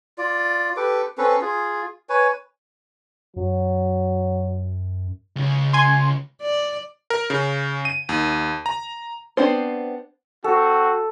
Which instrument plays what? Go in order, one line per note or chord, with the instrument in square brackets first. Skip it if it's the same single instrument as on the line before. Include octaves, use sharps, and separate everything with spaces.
[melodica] F4 D5
G4 A4 B4 D6
C4 C#4 A4 B4
F4 G#4
B4 C#5 G#5
[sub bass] F#2 [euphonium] F#3
[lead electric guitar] C#2 C#3
[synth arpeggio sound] G#5 C6
[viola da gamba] D5
[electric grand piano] A#4
C#3
D#7
D#2
A#5
[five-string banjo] B3 C4 D4 C5
[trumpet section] C4 F#4 [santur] A4